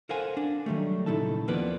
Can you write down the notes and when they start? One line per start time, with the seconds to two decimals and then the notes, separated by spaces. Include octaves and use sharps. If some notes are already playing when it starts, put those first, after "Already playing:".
0.09 A4 A#4 C5 F5 F#5 G#5
0.37 D4
0.66 D#3 F#3 G3 A3
1.06 A#2 C#3 D#4 E4 A4 A5
1.48 D#2 F3 A#3 B3 B4 D5